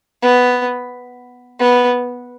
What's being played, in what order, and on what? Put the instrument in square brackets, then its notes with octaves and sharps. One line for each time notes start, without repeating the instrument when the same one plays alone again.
[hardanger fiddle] B3
B3